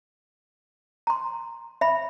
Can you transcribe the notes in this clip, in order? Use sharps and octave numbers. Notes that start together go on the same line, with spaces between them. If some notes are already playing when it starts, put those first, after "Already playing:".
A#5 C6
E5 B5